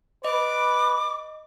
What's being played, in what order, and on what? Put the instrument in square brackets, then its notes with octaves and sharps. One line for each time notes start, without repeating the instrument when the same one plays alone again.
[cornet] B4 [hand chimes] D#5 [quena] D6